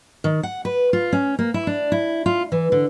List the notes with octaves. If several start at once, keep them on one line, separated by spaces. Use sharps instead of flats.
D#3
F#5
B4
F4
C#4
A#3
E4
D4
E4
F4
E3
D3